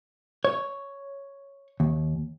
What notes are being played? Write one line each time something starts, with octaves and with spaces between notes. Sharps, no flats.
C#5
D#2